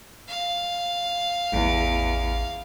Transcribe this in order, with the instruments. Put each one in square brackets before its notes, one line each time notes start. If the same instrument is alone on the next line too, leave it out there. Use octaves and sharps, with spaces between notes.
[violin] F5
[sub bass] A1 [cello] E2